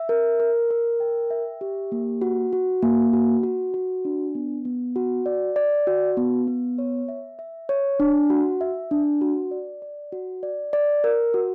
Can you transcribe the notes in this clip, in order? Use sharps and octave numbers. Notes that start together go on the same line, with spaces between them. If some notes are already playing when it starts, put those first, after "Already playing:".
Already playing: E5
A#4
A#4
A#4
G5
E5
G4
A#3
F#4
F#4
A#3
F#4
F#4
F#4
D4
B3
B3
F#4
D5
D5
F#4
B3
B3
C#5
E5
E5
C#5
D4
F#4
E5
D4
F#4
D5
D5
F#4
D5
D5
A#4
F#4